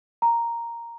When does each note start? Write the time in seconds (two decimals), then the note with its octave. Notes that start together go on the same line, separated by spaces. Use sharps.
0.22 A#5